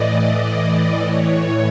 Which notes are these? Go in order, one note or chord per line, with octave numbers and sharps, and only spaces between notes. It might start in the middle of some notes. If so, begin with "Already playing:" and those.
Already playing: A2 E3 D5 D#5
D#5
A2 E3 C#5